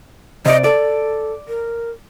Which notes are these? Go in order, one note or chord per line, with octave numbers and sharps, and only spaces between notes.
C3 D5 D#5
A4 D5
A#4